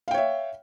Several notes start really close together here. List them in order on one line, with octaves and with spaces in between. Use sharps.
F5 G5 C#5 E5